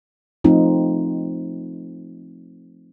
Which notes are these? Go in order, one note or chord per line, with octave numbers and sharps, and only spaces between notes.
F3 A3 C4 D#4 F4